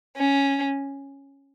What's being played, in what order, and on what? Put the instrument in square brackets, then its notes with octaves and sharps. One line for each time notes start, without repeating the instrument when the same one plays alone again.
[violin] C#4